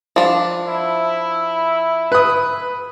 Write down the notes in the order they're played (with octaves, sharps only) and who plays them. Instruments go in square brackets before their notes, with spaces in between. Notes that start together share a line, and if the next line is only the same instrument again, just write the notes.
[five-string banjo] F3 D4
[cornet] E4
[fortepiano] B4 D#6